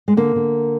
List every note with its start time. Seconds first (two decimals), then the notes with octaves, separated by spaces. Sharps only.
0.08 G#3
0.17 D3 A#3
0.36 D3